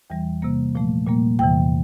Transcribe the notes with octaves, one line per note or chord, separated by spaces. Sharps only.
E2 E3 G3 G5
C3 G3 A#3
A#2 F3 A3
A#2 G3 A#3
E2 C3 E3 G5